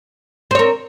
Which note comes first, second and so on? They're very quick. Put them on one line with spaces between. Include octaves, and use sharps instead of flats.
C4 C#5 A#4